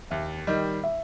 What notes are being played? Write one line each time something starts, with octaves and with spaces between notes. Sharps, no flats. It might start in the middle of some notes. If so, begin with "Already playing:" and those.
D#2 E5
D#3 G3 D#5
E5